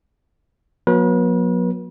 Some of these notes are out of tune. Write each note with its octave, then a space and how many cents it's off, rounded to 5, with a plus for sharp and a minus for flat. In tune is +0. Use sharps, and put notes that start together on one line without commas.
F#3 -45 B3 -45 B4 -40